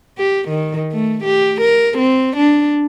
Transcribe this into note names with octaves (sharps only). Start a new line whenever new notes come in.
G4
D#3
A3
G4
A#4
C4
D4